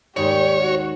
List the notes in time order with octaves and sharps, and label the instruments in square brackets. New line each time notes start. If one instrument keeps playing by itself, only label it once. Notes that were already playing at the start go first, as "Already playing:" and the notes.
[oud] D#2 G#2 D5 [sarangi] G4 [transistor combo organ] C#5
[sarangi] F#4